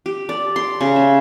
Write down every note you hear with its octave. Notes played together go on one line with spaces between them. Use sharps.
G4
D5
C6
C#3
E5